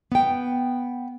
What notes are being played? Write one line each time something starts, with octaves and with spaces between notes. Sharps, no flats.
B3 G5